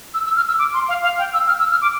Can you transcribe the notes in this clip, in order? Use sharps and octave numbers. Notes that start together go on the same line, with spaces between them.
E6
E6
F6
E6
D6
C6
F5
F5
G5
E6
F6
E6
F6
D6